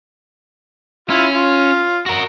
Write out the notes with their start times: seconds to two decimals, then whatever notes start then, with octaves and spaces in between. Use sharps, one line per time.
1.10 C#4 E4 F4
1.34 F4
2.06 F#4 A#4